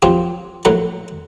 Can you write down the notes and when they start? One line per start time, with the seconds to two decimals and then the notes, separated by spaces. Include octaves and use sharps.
0.02 F3 F#3 C4 F4 G4
0.65 A#1 A2 F#3 F#5 A#5